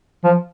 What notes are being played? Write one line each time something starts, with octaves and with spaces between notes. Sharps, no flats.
F3